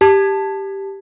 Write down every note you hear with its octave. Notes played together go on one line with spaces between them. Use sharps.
G4 A5 G#6